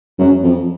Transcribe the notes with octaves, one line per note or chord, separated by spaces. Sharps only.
F#2
F2